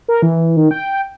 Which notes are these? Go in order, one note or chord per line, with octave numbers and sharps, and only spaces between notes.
A#4
E3
D#3
G5